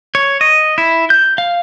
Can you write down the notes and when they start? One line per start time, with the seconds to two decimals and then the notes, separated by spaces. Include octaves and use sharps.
0.15 C#5
0.41 D#5
0.78 E4
1.10 G6
1.38 F5